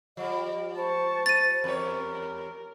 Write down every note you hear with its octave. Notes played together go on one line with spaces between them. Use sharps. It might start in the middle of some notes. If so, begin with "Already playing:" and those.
F3 G3 D#5
C5 A5 C#6
A6 D#7
E2 G4 A#4 C#5